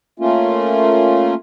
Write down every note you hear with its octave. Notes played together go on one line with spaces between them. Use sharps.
A3 A#3 C#4 F4